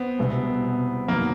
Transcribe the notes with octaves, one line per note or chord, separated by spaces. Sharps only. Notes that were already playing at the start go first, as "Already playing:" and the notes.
Already playing: B3 C4
C2 B2 G#3
F#2 D#3 F#3 A#3 B3